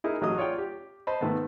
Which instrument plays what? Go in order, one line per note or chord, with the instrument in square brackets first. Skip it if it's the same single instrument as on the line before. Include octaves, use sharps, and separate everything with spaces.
[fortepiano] D#4 E4 G#4 A#4
A1 F#3 G#4 D#5 D#6
F4 C#5 D5 F#5 G5
G4
C5 D#5 A5 B5
G#2 D#3 A3 B3